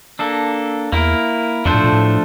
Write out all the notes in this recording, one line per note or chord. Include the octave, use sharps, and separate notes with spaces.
A#3 D4 A4
E2 A#3 E4 A#4
F2 F3 A3 D4 A4 C5
A2
A#2
A2